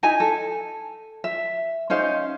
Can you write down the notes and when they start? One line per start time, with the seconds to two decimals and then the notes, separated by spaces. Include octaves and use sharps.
0.03 D#4 E4 G#5 A#5
0.20 A4
1.24 E5
1.90 C#4 D#4 C5 F5